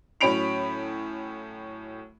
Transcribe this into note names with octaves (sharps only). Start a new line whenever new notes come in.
A2 F#3 C#4 B5 D7 F7